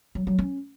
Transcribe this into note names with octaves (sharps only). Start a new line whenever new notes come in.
F#3
F#3
C#4